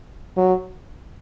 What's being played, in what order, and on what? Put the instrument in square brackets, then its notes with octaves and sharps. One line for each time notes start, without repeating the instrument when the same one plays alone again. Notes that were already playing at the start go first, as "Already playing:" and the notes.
[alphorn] F#3